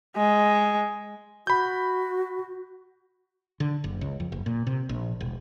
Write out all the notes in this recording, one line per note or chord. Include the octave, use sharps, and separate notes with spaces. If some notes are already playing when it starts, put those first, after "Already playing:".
G#3
F#4 B5 G6
D3
F#1
C#2
F2
F#1
A#2
C3
A#1
E1